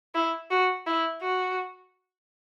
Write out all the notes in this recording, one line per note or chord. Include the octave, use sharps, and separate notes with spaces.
E4
F#4
E4
F#4